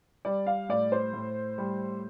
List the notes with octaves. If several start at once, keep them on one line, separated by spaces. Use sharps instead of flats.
G3 D5
F5
A2 D5
C5
A2
G3